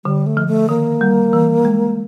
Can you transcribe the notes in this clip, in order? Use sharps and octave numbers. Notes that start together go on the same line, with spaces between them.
D3 G3
A3
F3
A3
D#3 A#3
G3
E3
G#3